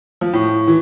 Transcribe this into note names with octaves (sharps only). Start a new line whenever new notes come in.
F3
A2
E3